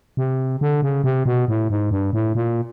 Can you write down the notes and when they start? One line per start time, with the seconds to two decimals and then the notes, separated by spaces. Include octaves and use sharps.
0.17 C3
0.61 D3
0.82 C#3
1.04 C3
1.26 B2
1.48 A2
1.70 G#2
1.91 G2
2.13 A2
2.35 A#2